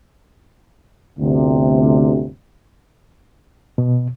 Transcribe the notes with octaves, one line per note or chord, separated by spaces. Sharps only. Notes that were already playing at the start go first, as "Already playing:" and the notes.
G1 D2 C3
B2